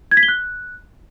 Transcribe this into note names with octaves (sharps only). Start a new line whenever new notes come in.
G#6
B6
G7
F#6